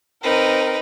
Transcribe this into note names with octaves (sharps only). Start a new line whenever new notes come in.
C4 D#4 A#4 B4